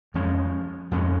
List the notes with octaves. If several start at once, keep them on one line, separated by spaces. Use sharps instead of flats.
F2 F3 G#3 C#4
F2 F3 G#3 C#4